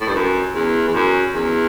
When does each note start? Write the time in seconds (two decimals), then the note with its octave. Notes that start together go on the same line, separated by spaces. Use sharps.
0.01 A2
0.08 G2
0.15 F#2
0.55 E2
0.87 E2
0.94 F#2
1.34 E2